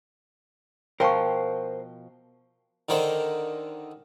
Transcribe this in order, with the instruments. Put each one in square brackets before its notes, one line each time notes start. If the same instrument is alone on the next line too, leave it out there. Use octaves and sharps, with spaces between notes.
[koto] B2 F3 [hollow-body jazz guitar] A#4 C5 [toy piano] G5 C#6
[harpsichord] D3 D#3 A#4 C5